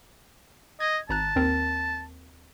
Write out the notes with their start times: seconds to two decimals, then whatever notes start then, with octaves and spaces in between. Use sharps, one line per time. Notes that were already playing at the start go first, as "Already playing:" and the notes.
0.80 D#5 G#6
1.09 G#1 A5 A#5 F#6
1.36 D#2 C4 A#4